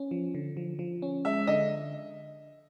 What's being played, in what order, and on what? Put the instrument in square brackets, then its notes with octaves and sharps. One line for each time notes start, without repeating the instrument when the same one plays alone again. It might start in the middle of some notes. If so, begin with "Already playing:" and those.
Already playing: [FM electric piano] C#4
F3
D3
F3
F3
C#4
[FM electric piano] G#3 [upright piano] E5
[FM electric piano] D3 [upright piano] D#5